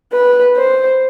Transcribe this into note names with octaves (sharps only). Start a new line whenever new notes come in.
B4
C5